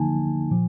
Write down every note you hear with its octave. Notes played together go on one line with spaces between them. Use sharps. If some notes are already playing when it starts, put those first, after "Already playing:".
Already playing: D3 F3 A#3 D#4 G#5 A5
A#2 F3